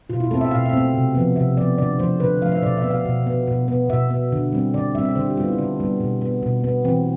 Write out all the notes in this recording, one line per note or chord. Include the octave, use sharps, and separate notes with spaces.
B2 F4
E4
A3 C4 A4
E5
B2 F5
E5
A3 C4
C3
F3 B3
C3 E5
F3 B3 D5
D3 D5
F3 A3 C5
D3 B4
F3 A3 F5
E5
C5
B2 D5
E5
B3
F5
B2
B3
B2
B3
B2 E5
B3
D3
G3 C4
D3 D5
G3 C4 E5
E5
D3 C5
G4
G3 B3 F4
E4
D3 D4
G3 B3
B2
B3
B2
B3
E3 C4